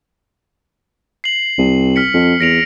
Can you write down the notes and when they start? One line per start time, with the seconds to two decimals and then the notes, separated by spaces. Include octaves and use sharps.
1.24 C7 F#7
1.58 C2
1.96 F6 B6 C#7
2.14 F2
2.40 E2 A#6 D7 F7